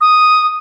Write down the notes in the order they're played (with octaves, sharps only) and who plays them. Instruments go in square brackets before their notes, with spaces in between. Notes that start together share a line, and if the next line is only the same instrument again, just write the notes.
[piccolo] D#6